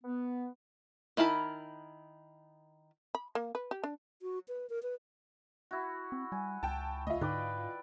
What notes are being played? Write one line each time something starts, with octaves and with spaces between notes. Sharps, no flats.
B3
D#3 E4 A#4 A5 B5
B5
A#3
B4
G4
D4
F#4
B4
A#4
B4
E4 F#4
C4
G3 G#5
C#2 G5 A5
D2 F4 D#5 E5
G#2 D3 D#4 B4 D5 G5 D6